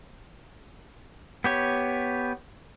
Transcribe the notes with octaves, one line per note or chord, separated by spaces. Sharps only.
B3 G4 C#5